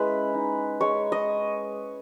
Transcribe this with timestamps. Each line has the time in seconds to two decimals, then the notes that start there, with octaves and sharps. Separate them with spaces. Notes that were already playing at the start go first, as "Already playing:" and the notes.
Already playing: G#3 C#4 E4 B4
0.34 D#4
0.81 G#3 C#5
1.12 D#5